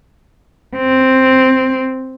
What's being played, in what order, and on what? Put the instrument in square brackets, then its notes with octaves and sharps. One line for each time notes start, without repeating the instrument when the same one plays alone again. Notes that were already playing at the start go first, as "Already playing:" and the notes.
[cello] C4